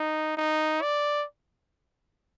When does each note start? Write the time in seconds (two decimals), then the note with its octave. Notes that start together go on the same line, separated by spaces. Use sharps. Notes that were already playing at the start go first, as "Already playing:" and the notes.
Already playing: D#4
0.37 D#4
0.82 D5